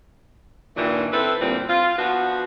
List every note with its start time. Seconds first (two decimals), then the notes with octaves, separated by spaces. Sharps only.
0.76 G2 A#2 D#3 E3
1.12 C4 E4 A4 B4
1.41 D2 A#2 G3 C4
1.68 F4
1.98 F3 B3 D4 F#4